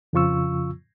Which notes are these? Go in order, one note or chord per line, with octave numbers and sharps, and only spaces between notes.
F2 C#3 F3 F4 C#6 E6